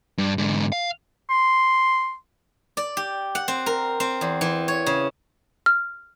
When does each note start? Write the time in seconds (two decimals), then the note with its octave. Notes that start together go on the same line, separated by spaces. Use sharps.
0.18 G2
0.38 G#2 D3
0.72 F5
1.30 C6
2.77 D5
2.97 G4
3.35 F#5
3.48 C4
3.66 A#4
4.00 C4
4.21 E2
4.41 E3
4.68 C#5
4.86 C#3
5.66 F6